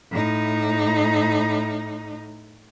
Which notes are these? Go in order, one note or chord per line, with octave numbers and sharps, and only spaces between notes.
A2 D#4